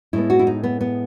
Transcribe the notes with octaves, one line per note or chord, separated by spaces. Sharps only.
A2 G#3 B3 E4
F#4
E4
D#4
B3
B3